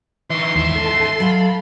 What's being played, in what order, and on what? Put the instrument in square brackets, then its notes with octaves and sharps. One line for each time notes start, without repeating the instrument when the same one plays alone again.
[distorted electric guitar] E3 D#4 [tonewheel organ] E5 C#6 [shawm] C6
[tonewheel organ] D#2 D#3 E3 [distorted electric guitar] G#2 E5 [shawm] C6
[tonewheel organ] A4 A5
[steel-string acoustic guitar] F#3 F5 [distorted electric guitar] B5